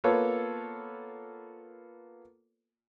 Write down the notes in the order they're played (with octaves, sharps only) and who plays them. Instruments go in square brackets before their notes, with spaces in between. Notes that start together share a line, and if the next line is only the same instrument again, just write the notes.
[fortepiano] A#3 B3 F4 A4 B4 C#5